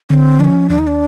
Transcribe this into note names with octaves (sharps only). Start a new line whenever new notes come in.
D3 C4 C#4
F3 D4
C#4
D#2 D4
D#4
D4